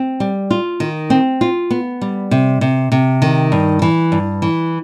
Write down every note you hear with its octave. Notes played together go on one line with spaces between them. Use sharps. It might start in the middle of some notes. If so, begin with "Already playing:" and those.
Already playing: C4
G3
F4
D#3
C4
F4
B3
G3
C3
C3
C3
D#3
G2
E3
G2
E3